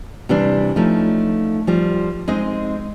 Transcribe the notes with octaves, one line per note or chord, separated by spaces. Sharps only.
C3 E3 G3 C4 D4
F3 A3 C#4 D#4
F3 G3
G#3 C4 D#4 D#5